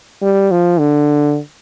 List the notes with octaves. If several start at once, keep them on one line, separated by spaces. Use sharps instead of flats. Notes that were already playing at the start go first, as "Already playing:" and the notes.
G3
F3
D3